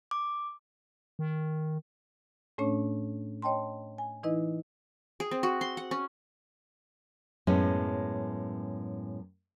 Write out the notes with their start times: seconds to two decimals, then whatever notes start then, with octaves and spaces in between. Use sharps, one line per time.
0.11 D6
1.19 D#3
2.58 A2 A3 C#4 D4 C#5
3.42 C#5 D#5 G5 A5 C6
3.98 G#5
4.23 E3 D#4 E4 B4 D#5
5.20 G#4
5.31 C4
5.43 F#4
5.61 C6
5.77 F#5
5.91 C#4
7.47 F#2 A2 G#3 B3 C#4